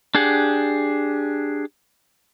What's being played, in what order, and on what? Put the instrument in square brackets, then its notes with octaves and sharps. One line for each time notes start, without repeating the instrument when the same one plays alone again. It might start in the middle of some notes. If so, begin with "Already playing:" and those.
[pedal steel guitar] D4 G4 G#4 F#5